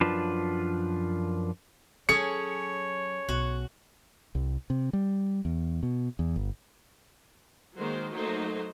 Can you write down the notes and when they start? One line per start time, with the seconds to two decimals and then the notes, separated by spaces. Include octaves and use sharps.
0.01 F#2 F3 D4 F4 B4 A5
2.09 F#3 C#4 G#4 A4 C#5 C#7
3.29 B1 F#4
4.35 C2
4.70 C3
4.93 G3
5.45 E2
5.83 B2
6.19 E2
6.36 G1
7.78 D#3 F#3 G#3 A#3 C5
8.12 F#3 A3 A#3 D#4 C5